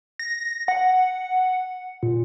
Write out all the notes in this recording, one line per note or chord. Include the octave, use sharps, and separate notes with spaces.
A#6
F#5
A#2